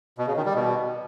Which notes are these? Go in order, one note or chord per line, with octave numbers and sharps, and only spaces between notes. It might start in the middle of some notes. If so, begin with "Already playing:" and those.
B2
C#3
D#3
G3
B2